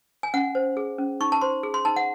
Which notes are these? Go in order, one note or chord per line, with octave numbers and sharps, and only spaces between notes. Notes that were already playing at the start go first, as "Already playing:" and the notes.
G#5
C#4 F#5
C5
G#4
C#4
D#4 C#6
A5
C5 C6
G#4
C6
D#4 A5
F#5